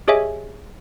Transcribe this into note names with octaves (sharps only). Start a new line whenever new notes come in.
G4 G#4 C#5 D#5 E5 G#5